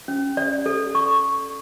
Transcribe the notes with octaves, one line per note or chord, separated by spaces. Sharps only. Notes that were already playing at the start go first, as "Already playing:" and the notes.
C#4
D5
A4
C#6